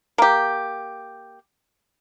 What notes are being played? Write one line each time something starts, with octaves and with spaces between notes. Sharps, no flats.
A#3 G4